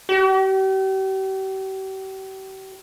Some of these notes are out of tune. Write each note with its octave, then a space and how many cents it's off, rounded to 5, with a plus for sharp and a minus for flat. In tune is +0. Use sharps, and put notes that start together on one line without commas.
G4 -40